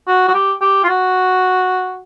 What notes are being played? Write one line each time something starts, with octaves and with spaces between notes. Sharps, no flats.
F#4
F#4
G4
G4
F4
F#4